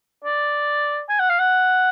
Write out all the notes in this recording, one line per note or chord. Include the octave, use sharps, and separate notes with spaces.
D5
G#5
F#5
F5
F#5